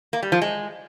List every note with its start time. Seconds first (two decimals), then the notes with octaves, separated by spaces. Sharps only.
0.13 A#3
0.23 G3
0.32 F3
0.42 G#3